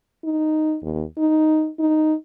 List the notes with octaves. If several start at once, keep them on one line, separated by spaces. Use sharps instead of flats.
D#4
D#2
D#4
D#4